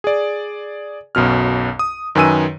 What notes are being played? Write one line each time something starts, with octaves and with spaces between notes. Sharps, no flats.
G#4 D5
B1 F#2 B2 F6
D#6
F#2 D#3 B4 G#5 E6 D#7